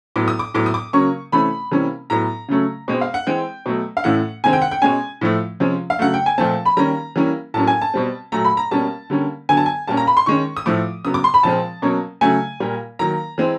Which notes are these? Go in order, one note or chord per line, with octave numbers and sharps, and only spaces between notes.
A2 F#3 B3 D6
D#6
D6
A2 F#3 B3 D6
D#6
D6
C#3 F#3 A#3 C#4 C#6
C3 E3 A3 C#4 B5
C3 E3 G3 A#3 C#4
A2 F#3 B3 A#5
C#3 F#3 A3 C#4
B2 G#3 C4
F5
F#5
E3 G#3 C4 G5
B2 F#3 A3
F5
A2 E3 A3 C#4 F#5
C3 D#3 G#3 C4 G#5
G5
F#5
G5
B2 G#3 C#4 G#5
A2 F3 A3
C3 F3 G#3 C#4
F5
C#3 F#3 A3 F#5
G5
G#5
A#2 F3 A3 C4 A5
B5
D#3 G3 A#3 C#4 A#5
E3 G3 A#3 C#4
A2 F#3 A#3 C#4 A5
G#5
A5
B2 G3 C4
A#2 F#3 A3 A#5
B5
A#5
B2 G3 A#3 C#4 A5
D3 G3 A#3 C#4
D3 F#3 B3 G#5
A5
G#5
A#2 G3 A#3 C#4 A5
A#5
B5
C6
D#3 G#3 C#4 C#6
D#6
A2 F3 A3 D6
C#3 F#3 B3 D#6
D6
C6
B5
A#2 F3 G#3 C4 A5
B2 F#3 A#3 C#4
C#3 F#3 A3 G#5
A#2 G3 A#3
D#3 F#3 A#3 A#5
E3 G#3 C4